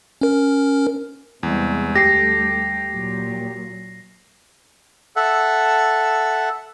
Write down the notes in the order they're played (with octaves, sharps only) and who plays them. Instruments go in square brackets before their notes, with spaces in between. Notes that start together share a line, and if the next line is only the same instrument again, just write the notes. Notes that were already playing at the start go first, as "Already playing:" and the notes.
[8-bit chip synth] C#4 A#4
[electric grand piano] E2 [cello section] C3 G3 G#3
[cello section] D2 G3 A4 [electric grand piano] G4 [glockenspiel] A#6 C7
[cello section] A#2 F#3
[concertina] A4 E5 F#5